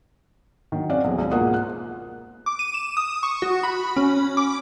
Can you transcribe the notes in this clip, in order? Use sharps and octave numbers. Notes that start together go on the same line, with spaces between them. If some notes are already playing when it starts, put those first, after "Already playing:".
D#3 F#3
C4 C#4 D5 F5 F#5
B1 E2
C#2
G#2 B2 A#3 F4 F#5 D#6
F#6
D6
D#7
E7
D#6
C#6
F#4
B5
C#4
D6